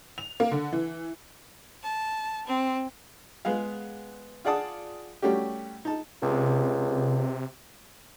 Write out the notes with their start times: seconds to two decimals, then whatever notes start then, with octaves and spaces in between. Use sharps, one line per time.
0.18 F7
0.40 A#3
0.51 D3
0.72 E3
1.83 A5
2.47 C4
3.45 G#3 B3 G#4 F5
4.45 F4 G#4 D5 F#5 A5 D#6
5.22 G3 A3 C#4 F#4 G4
5.85 D#4 A5
6.22 C#2 C3